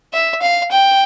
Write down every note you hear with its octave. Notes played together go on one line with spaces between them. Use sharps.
E5
F5
G5